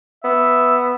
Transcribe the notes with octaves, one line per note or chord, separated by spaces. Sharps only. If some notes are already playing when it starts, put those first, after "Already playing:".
B3 E5